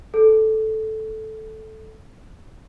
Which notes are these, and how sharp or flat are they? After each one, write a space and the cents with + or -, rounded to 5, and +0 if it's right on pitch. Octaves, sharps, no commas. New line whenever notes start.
A4 -10